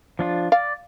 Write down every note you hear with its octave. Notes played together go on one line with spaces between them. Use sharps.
F3 D4 F4
D5 F5